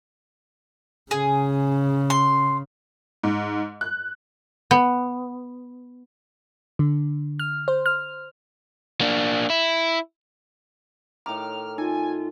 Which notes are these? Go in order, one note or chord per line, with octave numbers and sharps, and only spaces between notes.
C#3 G#4
C6
G#2
F#6
B3
D3
F6
C5
F6
A#3 D4
E4
A2 D#3 A#5 D6 F6
D#4 F4 G#5